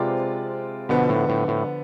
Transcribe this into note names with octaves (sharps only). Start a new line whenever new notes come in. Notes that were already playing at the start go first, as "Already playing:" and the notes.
Already playing: C3 G#3 C4 F4 B4 D5
B2 D3 F3 B3
A2
A2
A2